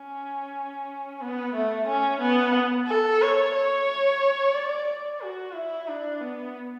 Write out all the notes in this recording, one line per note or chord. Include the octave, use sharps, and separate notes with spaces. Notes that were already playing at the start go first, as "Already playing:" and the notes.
Already playing: C#4
B3
A3
C#4
B3
A4
C#5
C#5
D5
D5
F#4
E4
D4
B3